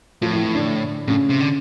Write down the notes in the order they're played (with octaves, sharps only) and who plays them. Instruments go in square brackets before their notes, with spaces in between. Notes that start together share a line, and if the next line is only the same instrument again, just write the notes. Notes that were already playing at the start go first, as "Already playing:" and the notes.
[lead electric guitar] A2 [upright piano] F3 F4
[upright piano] E3 E4
E3 E4
D3 D4
[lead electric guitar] A2 [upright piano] C#3 C#4
[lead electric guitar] C3
D3